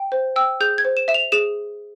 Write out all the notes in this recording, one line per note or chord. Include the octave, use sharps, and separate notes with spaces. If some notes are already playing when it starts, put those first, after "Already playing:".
Already playing: G5
C5
G5 E6
G#4 G6
G#6
C5
E7
E5 E7
F7
G#4 E7